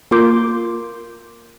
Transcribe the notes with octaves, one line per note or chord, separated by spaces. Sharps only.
A#3 F4 A#4 C6 D6 G6